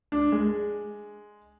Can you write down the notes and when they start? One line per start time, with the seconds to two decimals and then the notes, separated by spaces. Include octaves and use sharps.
0.12 D4
0.32 G#3